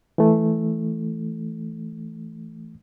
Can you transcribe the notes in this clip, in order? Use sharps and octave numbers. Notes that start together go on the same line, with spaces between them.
E3 A3